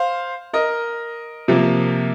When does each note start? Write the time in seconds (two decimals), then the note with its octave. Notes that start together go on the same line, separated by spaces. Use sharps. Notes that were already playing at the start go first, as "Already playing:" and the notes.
Already playing: C5 F5
0.53 A#4 D#5
1.48 C3 F3 A#3